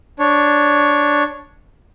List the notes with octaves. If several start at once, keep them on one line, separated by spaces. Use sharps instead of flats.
D4 C#5